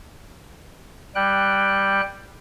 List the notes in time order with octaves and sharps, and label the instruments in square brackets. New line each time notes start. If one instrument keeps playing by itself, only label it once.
[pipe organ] G3 G5 F#6